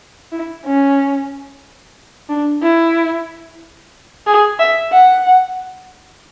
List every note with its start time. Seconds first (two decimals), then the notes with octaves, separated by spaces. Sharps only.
0.32 E4
0.66 C#4
2.29 D4
2.62 E4
4.27 G#4
4.59 E5
4.92 F#5